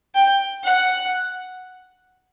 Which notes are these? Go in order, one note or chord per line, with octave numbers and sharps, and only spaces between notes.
G5
F#5